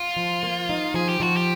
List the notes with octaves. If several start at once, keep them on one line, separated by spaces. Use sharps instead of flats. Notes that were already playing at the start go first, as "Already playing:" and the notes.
Already playing: F4
F3
A#3
D#4
F3 G#4
G4
F3 F#4
G4